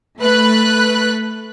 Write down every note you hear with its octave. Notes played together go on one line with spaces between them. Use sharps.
A3 B4 F#6